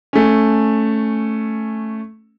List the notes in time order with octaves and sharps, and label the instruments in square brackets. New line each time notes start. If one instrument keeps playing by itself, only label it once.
[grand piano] A3 C#4